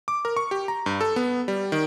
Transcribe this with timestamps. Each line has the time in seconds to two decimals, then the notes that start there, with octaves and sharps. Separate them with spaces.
0.08 D6
0.25 A#4
0.37 C#6
0.51 G4
0.68 A#5
0.86 G2
1.01 A4
1.16 B3
1.48 G3
1.72 D#3